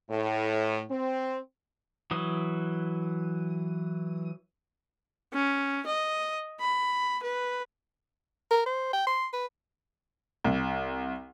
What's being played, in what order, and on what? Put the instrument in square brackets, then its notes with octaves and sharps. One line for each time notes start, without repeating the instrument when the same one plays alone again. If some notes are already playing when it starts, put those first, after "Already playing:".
[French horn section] A2
C4
[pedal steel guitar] E3 F#3 D#6
[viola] C#4
D#5
B5
B4
[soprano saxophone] A#4
C5
G5
C6
B4
[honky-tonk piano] C2